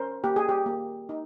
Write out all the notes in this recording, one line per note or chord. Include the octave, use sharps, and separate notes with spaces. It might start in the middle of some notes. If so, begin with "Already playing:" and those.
Already playing: C#4 A#4 C5
A#3 G4
G#4
G4
A#3
D#4